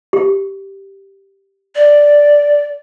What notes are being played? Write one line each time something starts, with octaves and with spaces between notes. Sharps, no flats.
G4
D5